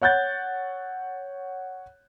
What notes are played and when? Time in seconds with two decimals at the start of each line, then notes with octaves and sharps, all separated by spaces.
0.01 C#5 F#5 F#6 G6 A6